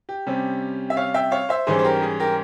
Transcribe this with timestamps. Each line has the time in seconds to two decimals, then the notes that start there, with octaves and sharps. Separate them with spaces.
0.09 G4
0.26 C3 G3 C#4
0.90 E5
0.97 C#5 F5
1.14 E5 G5
1.31 C#5 F5
1.49 C5 E5
1.67 G#2 E3 G3 C#4 G#4 C5
1.79 C5
1.84 G4 A#4
2.02 G#4
2.20 G4 A#4